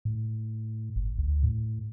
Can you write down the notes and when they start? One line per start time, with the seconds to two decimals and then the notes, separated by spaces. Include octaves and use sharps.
0.05 A2
0.96 G1
1.18 D2
1.43 A2